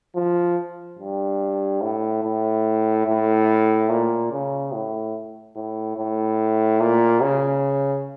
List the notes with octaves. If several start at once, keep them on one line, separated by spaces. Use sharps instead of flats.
F3
G2
A2
A2
A2
A#2
C#3
A2
A2
A2
A#2
C#3